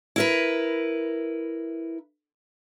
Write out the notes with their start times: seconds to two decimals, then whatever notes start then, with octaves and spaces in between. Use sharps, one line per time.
0.16 E4 A#4 B4